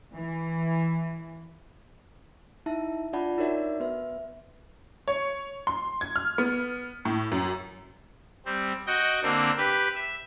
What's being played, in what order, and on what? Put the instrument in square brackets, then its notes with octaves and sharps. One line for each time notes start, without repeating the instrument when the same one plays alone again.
[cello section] E3
[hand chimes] D#4 E4 E5 A5
D4 F4 D5 F#5 A5 B5
D#4 F#4 A#4 C#5 D5 E5
B3 B4 E5
[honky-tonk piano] C#5
C6
G#6
F6
B3
A2
F#2
[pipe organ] G3 C4
F#4 D#5 G5
D3 A#3 C4 D4
G4 B4
E5